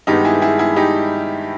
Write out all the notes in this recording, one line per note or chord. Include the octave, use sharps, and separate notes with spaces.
G2 D#3 G#3 B3 D#4 G4
E4 G#4
E4 G#4
E4 G#4
D#4 G4